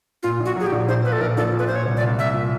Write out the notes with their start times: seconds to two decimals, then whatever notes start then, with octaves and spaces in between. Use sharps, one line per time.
0.23 A#2 F4
0.40 A#1
0.45 F#4
0.56 F#3 G#4
0.67 G4
0.72 A#1
0.88 A#1 C5
1.04 A#2 B4
1.12 A4
1.20 A#1 A#4
1.37 A#1 A4
1.53 A#2
1.59 B4
1.67 A#2 C5
1.75 C#5
1.86 C2
1.97 D5
2.02 C2
2.18 C2 E5
2.34 A#2